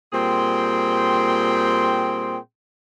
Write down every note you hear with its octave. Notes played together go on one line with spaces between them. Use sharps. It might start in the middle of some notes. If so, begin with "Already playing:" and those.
A#2 G3 C4 G#4 G5 C6